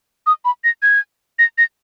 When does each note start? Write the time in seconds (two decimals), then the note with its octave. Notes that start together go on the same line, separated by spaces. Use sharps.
0.27 D#6
0.45 B5
0.64 A#6
0.82 G#6
1.39 A#6
1.58 A#6